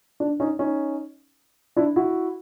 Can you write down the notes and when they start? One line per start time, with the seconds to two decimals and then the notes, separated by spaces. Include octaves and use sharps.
0.20 D4
0.40 C#4 D#4
0.59 C#4 D#4
1.76 D4 E4
1.96 E4 F#4